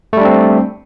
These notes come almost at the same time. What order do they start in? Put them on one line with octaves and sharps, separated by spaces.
A3 G3 D4 C4